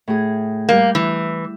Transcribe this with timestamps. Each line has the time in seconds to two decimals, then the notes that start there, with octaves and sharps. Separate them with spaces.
0.08 A2 G#4
0.69 G3 A#3 G6
0.95 E3